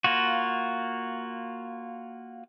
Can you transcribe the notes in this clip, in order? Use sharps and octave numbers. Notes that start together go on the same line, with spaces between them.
A#3 F4 F#4